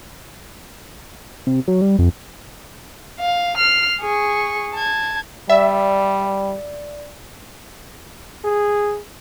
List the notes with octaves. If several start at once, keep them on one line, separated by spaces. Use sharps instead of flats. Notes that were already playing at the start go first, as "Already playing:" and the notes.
C3
F#3
G3
F2
F5
F6 C7
G#4 C#6
A5 G#6
G3 D5 E5
G#4